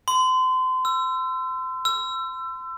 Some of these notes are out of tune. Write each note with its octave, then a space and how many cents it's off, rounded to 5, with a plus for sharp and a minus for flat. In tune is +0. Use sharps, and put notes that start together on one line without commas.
C6 -30
E6 +25
E6 +30